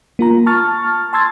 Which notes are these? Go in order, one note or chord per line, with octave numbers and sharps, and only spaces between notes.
A#3 F4 A#5
A5 C#6 F6 A6
A5 C6 E6 G#6 A6